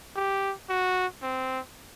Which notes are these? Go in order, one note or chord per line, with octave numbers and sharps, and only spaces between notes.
G4
F#4
C4